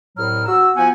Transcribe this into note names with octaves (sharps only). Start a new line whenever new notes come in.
C2 A2 F#3 F6
F#4 E6
F3 B3 F#5 G#5